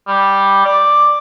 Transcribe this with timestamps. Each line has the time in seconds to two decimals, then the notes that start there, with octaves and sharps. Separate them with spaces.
0.08 G3
0.65 D5